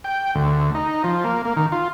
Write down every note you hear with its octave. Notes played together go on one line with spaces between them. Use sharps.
G5
D2
D#4
F3
A#3
A#3
D#3
F4